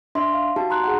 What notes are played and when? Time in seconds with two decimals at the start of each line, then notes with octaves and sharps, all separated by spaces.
0.15 D4 E5 C6
0.33 F5
0.56 D#4 F#4 G4 A5
0.70 A#5 C6 F#6
0.84 G#4 F#5